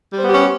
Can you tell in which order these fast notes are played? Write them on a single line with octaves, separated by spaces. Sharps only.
G3 C5 B3 G4 C#4